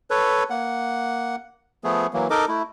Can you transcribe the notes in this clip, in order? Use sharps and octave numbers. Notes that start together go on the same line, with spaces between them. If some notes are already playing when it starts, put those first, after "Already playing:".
A4 B4 C#5
A#3 F#5
F3 A3 B3 G#4
E3 F#3 A#3
D#4 A4 A#4 D#5 D6
A3 E4